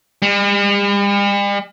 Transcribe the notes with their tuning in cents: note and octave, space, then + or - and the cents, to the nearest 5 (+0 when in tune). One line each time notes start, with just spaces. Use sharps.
G3 +45